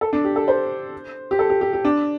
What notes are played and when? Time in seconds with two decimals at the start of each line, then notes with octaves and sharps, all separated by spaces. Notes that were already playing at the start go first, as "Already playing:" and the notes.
0.01 A4
0.13 D4
0.24 G4
0.36 A4
0.48 C5
1.31 G4
1.39 A4
1.50 G4
1.61 G4
1.73 G4
1.85 D4